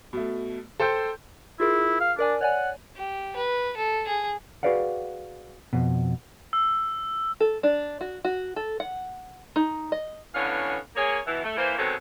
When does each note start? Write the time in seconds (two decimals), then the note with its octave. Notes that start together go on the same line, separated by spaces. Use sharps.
0.13 B2 A3
0.80 A4 C5 G5 G6
1.60 E4 F4 G#4 A#4
2.00 F5
2.19 D4 A#4 D5 G#5
2.41 C#5 D5 F#5 G#5
2.97 G4
3.36 B4
3.77 A4
4.07 G#4
4.63 F#4 G#4 B4 D5 F5 F#5
5.73 F2 B2
6.53 E6
7.40 A4
7.63 D4
8.01 F#4
8.24 F#4
8.56 A4
8.80 F#5
9.56 D#4
9.92 D#5
10.35 D3 E3 B3 C#4 C#5 F5
10.96 A#3 G#4 C#5
11.27 B2 E3
11.44 A3
11.57 E3 A#3 C5
11.78 B2 D#3 G#3 C4 A4 C#5